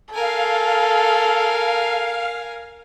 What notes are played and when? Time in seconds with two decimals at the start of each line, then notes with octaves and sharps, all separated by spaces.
0.14 A4 A#4 F5 G#5